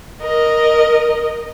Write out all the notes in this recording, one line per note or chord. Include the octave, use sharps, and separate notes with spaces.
A#4 D#5